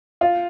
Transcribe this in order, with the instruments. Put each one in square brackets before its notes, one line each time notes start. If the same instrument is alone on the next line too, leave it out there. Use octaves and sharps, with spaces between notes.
[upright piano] F4